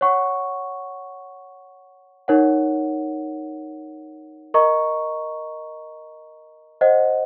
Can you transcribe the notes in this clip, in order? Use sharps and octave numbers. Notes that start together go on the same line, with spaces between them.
C#5 F#5 C#6
D#4 A#4 C#5 F#5
A#4 D#5 A#5 C#6
C5 D#5 F#5